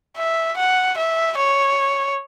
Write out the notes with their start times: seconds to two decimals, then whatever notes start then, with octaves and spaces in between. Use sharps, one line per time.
0.17 E5
0.57 F#5
0.98 E5
1.38 C#5